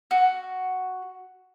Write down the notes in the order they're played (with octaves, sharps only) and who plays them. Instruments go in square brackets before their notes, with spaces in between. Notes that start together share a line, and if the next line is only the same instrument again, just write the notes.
[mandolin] F#4